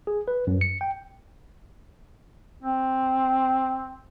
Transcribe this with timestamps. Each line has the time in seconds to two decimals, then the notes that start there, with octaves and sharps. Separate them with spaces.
0.07 G#4
0.28 B4
0.47 F#2
0.61 C#7
0.81 G5
2.63 C4